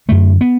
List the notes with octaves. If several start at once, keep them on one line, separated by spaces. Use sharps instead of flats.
F#2 D3 A3
B3